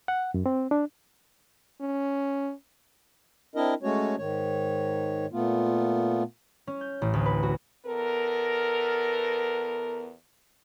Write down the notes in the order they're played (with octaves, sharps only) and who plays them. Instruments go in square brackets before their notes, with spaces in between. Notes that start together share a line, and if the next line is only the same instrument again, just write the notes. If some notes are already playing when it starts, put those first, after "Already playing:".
[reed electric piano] F#5
F#2
C4
D4
[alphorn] C#4
[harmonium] C4 D4 E4 A#4 D#5
G#3 A3 C#4 F#4 C#5
G#2 D#3 C#5
A#2 A3 B3 F4
[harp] C#4
G6
A1
D2
B4
F#4
[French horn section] E2 B3 A4 A#4